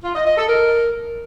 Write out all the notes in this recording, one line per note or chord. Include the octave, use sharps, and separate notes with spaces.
F4
D#5
D#5
A4
A#4